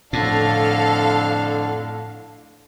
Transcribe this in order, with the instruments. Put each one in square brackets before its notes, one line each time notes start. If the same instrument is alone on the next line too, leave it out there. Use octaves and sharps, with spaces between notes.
[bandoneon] F2 D3 D4 [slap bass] A2 [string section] A4 F5